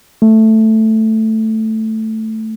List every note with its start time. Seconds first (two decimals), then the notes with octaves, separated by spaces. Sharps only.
0.22 A3